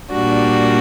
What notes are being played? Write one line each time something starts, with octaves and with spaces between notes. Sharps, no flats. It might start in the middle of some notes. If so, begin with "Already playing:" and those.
A#2 G3 D4 F#4